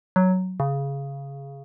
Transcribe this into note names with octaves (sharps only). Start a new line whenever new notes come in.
F#3
C#3